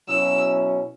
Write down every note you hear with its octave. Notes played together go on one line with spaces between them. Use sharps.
B2 F#3 C#4 E4 E6